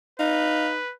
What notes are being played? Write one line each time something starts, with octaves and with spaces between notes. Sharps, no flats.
D#4 B4 F5